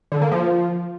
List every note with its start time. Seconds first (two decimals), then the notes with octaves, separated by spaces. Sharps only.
0.12 D3
0.22 A#3
0.32 F3